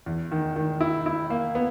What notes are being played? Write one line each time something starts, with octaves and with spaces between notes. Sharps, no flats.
E2
D#3
D#3
E4
E4
A#3
B3